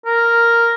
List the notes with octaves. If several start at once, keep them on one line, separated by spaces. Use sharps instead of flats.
A#4